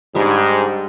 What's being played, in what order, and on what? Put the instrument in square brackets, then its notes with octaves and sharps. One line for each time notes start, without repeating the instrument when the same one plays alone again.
[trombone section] G#2 [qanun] G3 D4 G4